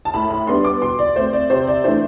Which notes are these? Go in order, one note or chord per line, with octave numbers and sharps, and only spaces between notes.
A5
A2 B5
B5
G3 B3 D4 C6
D6
B2 C6
D5
A3 C4 C5
D5
C3 C5
D5
E3 A3 D4 C5